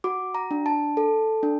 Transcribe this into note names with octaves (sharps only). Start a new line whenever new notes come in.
F#4 D6
A#5
D4
A5
A4
D4